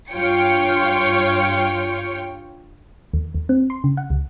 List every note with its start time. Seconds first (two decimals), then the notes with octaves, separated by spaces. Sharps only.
0.12 G2 F4 C#5 G5 C#7
3.13 D#2
3.34 D#2
3.49 C4
3.70 C6
3.84 C#3
3.97 F#5
4.10 C#2